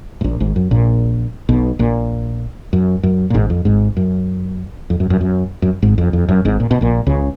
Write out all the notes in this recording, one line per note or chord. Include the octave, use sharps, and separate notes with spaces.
G#2
A#1 A#2
G#1 G#2
F#2
A#1 A#2
B1 B2
A#1 A#2
F#2
F#2
A#2
G#1 G#2
F2
G#1 G#2
F#2
F2
F#2
F#2
F#2
F#2
G#1 G#2
F2
F2
F#2
G#1 G#2
A#2
B2
A#1 A#2
C#2 C#3